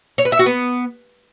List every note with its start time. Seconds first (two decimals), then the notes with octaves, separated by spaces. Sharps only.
0.18 C#5
0.25 B4
0.32 E5
0.39 F#4
0.46 B3